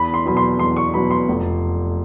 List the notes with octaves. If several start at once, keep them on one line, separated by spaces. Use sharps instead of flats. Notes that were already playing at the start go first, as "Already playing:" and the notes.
Already playing: E2 B5
C6
B2 F#3 B5
C6
E2 C6
C#6
B2 F#3 B5
C6
F1